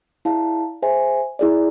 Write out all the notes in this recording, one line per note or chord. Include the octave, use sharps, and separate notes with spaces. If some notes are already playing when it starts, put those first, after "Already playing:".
E4 G#4 D5 F5 A5
G#4 C5 E5 G#5
E4 G#4 D5